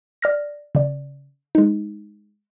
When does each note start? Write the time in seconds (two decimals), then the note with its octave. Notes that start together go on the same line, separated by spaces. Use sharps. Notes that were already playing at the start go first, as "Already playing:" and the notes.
0.22 D5 F6 A#6
0.75 C#3 D5
1.55 G#3 D#4